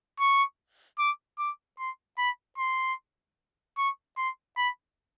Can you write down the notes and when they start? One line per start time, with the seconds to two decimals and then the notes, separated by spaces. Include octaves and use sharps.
0.20 C#6
0.99 D6
1.39 D6
1.79 C6
2.18 B5
2.58 C6
3.77 C#6
4.17 C6
4.57 B5